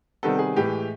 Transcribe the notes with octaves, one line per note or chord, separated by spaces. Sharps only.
C3 D#3 G3 B3 A4
G#4
A2 E3 G#3 G4